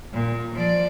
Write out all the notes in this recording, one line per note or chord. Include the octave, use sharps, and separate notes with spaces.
A#2
F3 D5